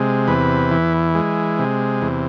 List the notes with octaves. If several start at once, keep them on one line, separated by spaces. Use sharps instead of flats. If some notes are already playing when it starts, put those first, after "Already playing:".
Already playing: C3 G#3
E2 B4
E3
G#3
C3
E2